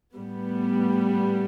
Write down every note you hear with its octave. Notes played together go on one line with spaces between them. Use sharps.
A2 G3 B3